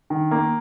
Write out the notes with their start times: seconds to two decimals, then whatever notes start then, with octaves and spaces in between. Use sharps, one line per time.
0.10 D#3
0.31 A#3